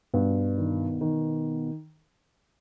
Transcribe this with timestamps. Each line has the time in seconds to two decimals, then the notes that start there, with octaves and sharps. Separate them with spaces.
0.14 G2 B2
0.58 D#3
1.01 D#3